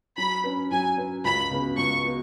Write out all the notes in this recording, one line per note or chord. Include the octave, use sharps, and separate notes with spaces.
F#3 B5
C#4 B4
F#3 G#5
C#4 B4
C#2 B5
C#3 B3 F#4
C#2 C#6
B3 F#4